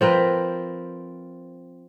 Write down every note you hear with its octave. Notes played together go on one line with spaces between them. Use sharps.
F3 C4 A#4 B4